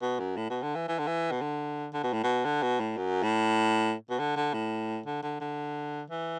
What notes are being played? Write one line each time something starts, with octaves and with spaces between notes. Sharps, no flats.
B2
F#2
A2
B2
D3
E3
E3
D3
E3
B2
D3
D3
B2
A2
B2
D3
B2
A2
F#2
A2
B2
D3
D3
A2
D3
D3
D3
E3